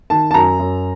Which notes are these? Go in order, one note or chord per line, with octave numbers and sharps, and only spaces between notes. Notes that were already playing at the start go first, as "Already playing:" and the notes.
D#3 A5
A5
F#2 A#5
F#2